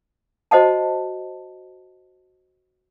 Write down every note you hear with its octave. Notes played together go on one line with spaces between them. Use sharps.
F#4 C5 D#5 F#5 A5